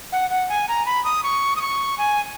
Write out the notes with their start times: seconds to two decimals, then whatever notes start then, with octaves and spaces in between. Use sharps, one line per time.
0.12 F#5
0.31 F#5
0.49 G#5
0.68 A#5
0.86 B5
1.05 D#6
1.23 C#6
1.56 D#6
1.62 C#6
1.98 G#5